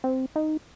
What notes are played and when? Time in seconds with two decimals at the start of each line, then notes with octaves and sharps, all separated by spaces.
0.04 C4
0.36 D#4